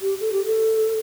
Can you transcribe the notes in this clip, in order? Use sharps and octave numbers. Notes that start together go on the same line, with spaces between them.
G4
A4
G4
A4